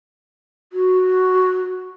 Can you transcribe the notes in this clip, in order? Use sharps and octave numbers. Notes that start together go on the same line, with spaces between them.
F#4